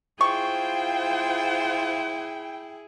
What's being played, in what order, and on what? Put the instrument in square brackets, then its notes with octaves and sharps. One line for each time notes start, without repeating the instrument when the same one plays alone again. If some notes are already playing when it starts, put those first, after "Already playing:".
[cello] E4 G#4 [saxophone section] F4 C5 [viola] G5 [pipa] C#6